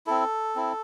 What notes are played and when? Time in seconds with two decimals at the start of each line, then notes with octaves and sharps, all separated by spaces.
0.07 C4 E4 A4
0.56 C4 E4